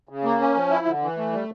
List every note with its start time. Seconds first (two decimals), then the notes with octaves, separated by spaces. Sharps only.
0.09 C#3
0.24 A#3
0.40 C#4
0.55 F3
0.70 E4
0.86 D3
1.02 E3
1.17 A3
1.33 G3